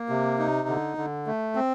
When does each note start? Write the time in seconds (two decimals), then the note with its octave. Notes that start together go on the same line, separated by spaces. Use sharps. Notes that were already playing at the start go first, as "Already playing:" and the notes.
Already playing: A#3
0.09 C3
0.39 D#4
0.68 D3
0.97 D3
1.27 A3
1.55 C4